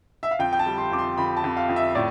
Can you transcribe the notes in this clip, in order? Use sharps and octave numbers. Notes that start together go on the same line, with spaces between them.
E5
F5
F2 G5
G5
A5
G3
C6
F2 D6
C6
F2 B5
A5
F2
F5
F2
E5
A2 D5